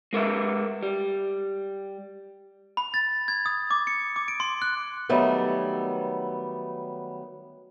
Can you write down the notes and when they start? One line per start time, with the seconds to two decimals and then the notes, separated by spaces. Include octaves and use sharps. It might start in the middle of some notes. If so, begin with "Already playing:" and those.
0.13 G#3 A#4 B4 E5
0.83 G3
2.77 B5
2.94 A6
3.28 G#6
3.46 D#6
3.71 D6
3.87 C#7
4.16 D6
4.28 D7
4.40 C6
4.62 F#6
5.09 D#3 F#3 G3 A3 B3